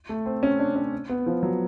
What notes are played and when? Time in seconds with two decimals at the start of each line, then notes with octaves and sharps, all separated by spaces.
0.09 A3
0.26 C4
0.43 C#4
0.59 D4
0.76 C#4
1.09 B3
1.26 F3
1.43 F#3